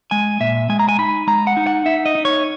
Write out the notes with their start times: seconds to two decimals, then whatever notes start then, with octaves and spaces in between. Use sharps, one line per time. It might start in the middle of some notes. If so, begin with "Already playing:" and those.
0.11 G#3 G#5
0.40 A#2 E5
0.69 G#3 G#5
0.79 A#5
0.89 G#5
0.98 D#4 B5
1.27 G#3 A#5
1.47 F#5
1.57 D#4
1.67 F#5
1.85 D#4 E5
2.06 D#5
2.15 D#4
2.25 C#5